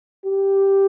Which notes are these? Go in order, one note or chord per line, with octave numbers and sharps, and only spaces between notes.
G4